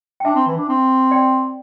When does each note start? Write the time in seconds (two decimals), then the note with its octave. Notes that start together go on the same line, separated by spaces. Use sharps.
0.20 G5
0.25 D4 E5 A5
0.35 C4
0.47 E3
0.57 D4
0.69 C4
1.11 D5 G5